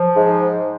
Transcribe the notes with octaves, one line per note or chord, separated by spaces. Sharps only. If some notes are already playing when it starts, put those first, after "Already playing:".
Already playing: F3
G#2